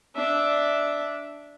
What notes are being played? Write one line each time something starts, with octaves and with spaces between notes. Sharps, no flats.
D4 E5